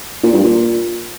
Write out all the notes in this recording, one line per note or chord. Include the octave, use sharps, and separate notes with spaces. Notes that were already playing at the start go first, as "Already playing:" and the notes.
A#2
G2
A#2